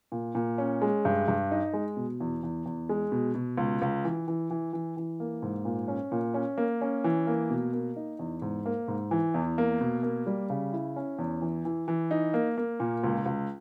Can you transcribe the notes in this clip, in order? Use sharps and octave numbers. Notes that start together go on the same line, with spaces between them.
A#2
A#2
C#4
G#3
G2
G2
D#4
G#3
B2
E2
E2
E2
G#3
B2
B2
C#2
C#2
E3
E3
E3
E3
E3
A#3
G#2
A#2
C#4
A#2
C#4
A#3
C#4
E3
A#3
B2
A#3
D#4
E2
G#2
A#3
G#2
E3
E2
A#3
B2
A#3
G3
C#3
E4
C#4
E2
E3
E3
E3
D#4
A#3
A#3
A#2
C#2
C#2